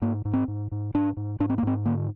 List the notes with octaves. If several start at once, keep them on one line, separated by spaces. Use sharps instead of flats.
G#2 A#3
G#2
C4
G#2
G#2
G#2 D4
G#2
G#2 D4
C4
A#3
G#2 C4
D3 A#3